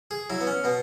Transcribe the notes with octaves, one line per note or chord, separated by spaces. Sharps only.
G#4
F#3 E4
B3
C#4
B2 B3